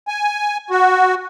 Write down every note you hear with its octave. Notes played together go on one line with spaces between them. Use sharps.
G#5
F#4